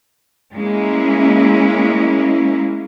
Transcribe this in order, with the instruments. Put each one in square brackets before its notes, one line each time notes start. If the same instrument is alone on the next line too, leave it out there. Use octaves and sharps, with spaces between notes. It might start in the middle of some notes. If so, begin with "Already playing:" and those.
[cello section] G#3 A#3 C#4 E4